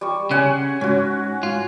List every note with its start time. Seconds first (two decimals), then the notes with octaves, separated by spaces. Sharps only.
0.01 G3 C#6
0.31 C#3 C#5 F#5 G#5
0.81 G#2 C#4 F#4
1.43 F4